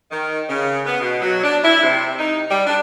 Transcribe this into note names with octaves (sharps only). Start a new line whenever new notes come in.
D#3
C#3
B3
B2
F#3
D4
E4
C3
D#4
G3
D4